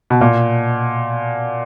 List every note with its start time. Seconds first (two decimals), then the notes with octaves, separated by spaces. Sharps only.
0.10 B2
0.21 A#2